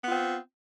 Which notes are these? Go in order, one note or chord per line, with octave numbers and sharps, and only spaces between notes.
B3 C4 F4